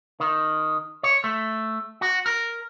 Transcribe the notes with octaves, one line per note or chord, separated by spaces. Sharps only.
D#3
C#5
A3
F#4
A#4